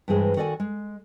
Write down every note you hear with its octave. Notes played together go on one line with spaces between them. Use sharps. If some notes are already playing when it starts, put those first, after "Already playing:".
G2 E3 G#3 G#4 C5
D#3 F#4 A4 D5 D#5 G#5
G#3